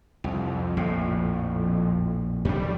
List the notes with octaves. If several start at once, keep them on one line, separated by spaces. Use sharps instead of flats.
C2 F2
A#1 A2
F2 D#3 G3 D4